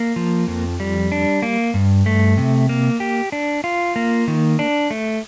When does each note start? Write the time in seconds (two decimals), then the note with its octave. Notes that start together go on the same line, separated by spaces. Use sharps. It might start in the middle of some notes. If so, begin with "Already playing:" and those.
Already playing: A#3
0.16 F3
0.47 F2
0.80 G3
1.12 D4
1.42 A#3
1.74 G2
2.06 A3
2.37 C3
2.69 A#3
3.00 G4
3.32 D4
3.64 F4
3.96 A#3
4.28 D#3
4.59 D4
4.91 A3